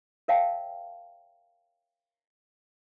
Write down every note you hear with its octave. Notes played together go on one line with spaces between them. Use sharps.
A#4 C#5 E5 F5 G5 A5